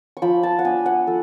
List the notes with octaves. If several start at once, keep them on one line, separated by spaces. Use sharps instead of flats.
C#6
F3 B5
A5
F#5
B3 D4 G#5
F#5
F3 A4